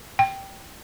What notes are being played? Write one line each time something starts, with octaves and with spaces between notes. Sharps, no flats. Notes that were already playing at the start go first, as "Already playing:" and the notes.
G5